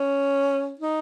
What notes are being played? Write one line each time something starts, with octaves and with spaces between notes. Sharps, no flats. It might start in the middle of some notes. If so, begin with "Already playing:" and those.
Already playing: C#4
D#4